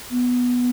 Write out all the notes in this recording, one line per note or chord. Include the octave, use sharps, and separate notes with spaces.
B3